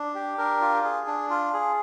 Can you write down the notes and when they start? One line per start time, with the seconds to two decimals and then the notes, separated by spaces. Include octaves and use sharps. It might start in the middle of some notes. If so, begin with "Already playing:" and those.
Already playing: D4
0.15 G4
0.38 D4 A#4
0.61 F4
0.84 G#4
1.07 D4
1.30 F4
1.54 G#4